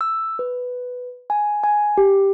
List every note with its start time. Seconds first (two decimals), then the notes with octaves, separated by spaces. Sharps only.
0.01 E6
0.39 B4
1.30 G#5
1.64 G#5
1.98 G4